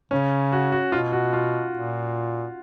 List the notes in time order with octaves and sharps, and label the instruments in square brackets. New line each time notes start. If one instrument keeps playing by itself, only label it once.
[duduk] C#3 [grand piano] C#4
[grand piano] F#4
F#4
[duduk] B2 [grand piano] F4
[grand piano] F#4
F4
[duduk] A#2